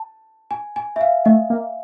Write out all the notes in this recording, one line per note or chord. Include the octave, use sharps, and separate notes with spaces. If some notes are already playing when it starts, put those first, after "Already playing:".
Already playing: A5
G#5
G#5
E5
F5
A3 D#5
A#3